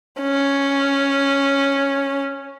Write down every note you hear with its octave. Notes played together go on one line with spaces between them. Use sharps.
C#4